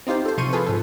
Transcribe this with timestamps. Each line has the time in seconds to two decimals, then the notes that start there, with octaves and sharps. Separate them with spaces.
0.07 C4 D#4 F4 G4 C5
0.25 A4 C5
0.38 C3 F3 C6 C#6 D#7
0.53 F3 F4 G#4 A4 B4
0.66 G#2 A4